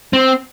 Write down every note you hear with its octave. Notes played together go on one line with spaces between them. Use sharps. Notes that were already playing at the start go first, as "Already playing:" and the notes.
C4